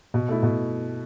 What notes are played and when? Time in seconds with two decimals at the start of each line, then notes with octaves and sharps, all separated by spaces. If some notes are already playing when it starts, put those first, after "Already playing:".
0.14 B2
0.29 A3 E4
0.43 B2